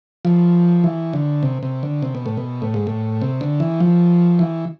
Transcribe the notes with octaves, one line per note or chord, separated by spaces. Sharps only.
F3
E3
D3
C3
C3
D3
C3
B2
A2
B2
A2
G#2
A2
C3
D3
E3
F3
E3